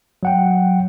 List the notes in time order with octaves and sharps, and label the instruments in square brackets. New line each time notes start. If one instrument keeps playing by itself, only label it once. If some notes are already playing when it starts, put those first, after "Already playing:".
[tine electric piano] F#3 F#5 G5